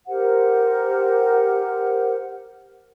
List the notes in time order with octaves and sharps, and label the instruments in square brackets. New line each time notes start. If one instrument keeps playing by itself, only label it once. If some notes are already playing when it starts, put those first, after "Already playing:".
[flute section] G4 A#4 C5 F#5